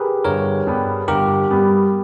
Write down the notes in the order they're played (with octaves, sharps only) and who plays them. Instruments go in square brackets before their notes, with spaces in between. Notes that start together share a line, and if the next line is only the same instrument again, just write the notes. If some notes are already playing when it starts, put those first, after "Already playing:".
Already playing: [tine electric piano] G4 G#4 A#4 B4
[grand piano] G1 [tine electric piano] A#4 C#5
[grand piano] G2 G3 B3 G4
[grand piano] G1 [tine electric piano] G4 A#4
[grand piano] G2 G3 B3 G4